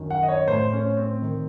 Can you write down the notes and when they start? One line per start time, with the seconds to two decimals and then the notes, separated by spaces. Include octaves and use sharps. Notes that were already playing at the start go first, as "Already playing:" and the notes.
Already playing: F#2 D#3
0.11 F#5
0.23 D#5
0.28 C#5
0.48 A2 C5
0.72 C#4
0.97 C4
1.22 D#3